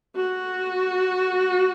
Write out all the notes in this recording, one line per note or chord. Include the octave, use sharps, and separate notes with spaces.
F#4